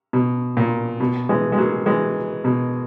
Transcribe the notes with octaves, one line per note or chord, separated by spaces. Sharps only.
B2
A#2
B2
E3 G#3
G#3
F#3 A#3
E3 G#3
B2